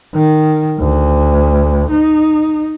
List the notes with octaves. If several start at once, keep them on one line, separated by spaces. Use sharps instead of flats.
D#3
D2
D#4